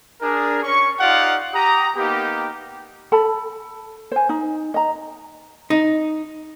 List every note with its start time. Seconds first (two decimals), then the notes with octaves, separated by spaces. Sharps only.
0.21 D4 G#4 A#4
0.63 C#4 C#6
1.00 D#4 F4 G4 D5 F5 F#5
1.54 G4 A#5 D#6
1.96 A#3 B3 D#4 G4
3.12 A4 A5 B5
4.12 C5 G#5
4.29 D#4
4.74 D#5 A#5
5.70 D#4